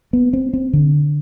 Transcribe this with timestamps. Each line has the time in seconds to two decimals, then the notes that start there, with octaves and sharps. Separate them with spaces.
0.13 B3
0.33 C4
0.53 C4
0.73 D3